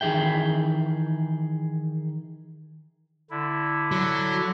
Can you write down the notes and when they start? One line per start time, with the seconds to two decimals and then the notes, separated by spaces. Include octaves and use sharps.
0.01 D#3 E3 G#4 E5 G5
3.31 D3 E4
3.92 F#3